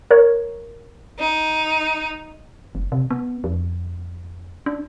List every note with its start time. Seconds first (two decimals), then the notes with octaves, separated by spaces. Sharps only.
0.11 A#4 C#5
1.19 D#4
2.75 F#1
2.92 C3
3.11 B3
3.44 F2
4.66 D4